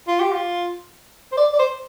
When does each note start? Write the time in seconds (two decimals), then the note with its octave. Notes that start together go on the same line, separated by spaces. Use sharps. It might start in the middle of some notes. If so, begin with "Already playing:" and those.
0.08 F4
0.20 G4
0.33 F4
1.32 C5
1.37 D5
1.53 D5
1.59 C5